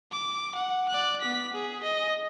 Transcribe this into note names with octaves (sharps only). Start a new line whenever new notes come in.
D6
F#5
D5 F#6
B3 B6
G#4
D#5